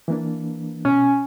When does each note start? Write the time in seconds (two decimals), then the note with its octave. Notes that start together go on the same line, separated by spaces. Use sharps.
0.08 E3 A#3 D4
0.85 B2 C#4